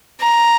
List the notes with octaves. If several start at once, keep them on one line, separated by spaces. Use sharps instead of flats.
A#5